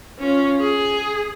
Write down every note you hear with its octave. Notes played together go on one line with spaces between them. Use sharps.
C#4 F4
G#4